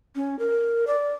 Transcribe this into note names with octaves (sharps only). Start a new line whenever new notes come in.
C#4
A#4
D5